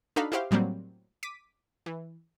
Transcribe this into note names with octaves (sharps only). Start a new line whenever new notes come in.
D4 D#4 F#4 A4 F5 B5
E4 F#4 G4 C5 F5
A2 F#3 G3 A#3 C4
D6 B6 D#7
E3